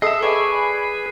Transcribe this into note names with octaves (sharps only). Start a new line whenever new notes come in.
A4 D#5 E5 D#6 C7
G#4 B4 D5 G#5 C#6